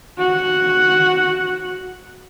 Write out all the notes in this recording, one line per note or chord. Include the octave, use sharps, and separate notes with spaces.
F#4 F#5